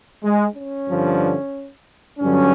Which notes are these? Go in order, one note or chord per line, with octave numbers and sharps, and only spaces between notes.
G#3
C#4
G2 D3 F3
G2 D3 F#3 C#4